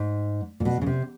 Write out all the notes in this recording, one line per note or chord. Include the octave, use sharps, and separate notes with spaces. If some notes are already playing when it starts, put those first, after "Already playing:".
Already playing: G#2
A#2
B2
C#3
C3